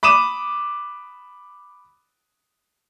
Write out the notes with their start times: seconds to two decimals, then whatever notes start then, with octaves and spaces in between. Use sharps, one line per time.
0.03 B5 D6 D#6 D#7 E7